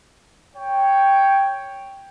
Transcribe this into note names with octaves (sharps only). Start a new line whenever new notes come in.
C#5 G5